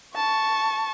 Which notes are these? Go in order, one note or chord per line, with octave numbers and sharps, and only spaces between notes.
A5 C#6